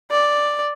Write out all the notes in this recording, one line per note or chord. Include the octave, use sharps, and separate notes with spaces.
D5